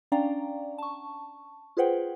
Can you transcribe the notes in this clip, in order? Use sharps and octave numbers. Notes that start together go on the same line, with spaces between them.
C#4 D4 D5 F5 G5 A#5
A5 C#6
F4 G#4 B4 C5 F#5 G5